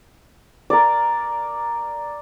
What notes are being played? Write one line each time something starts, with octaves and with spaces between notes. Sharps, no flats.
A#4 D5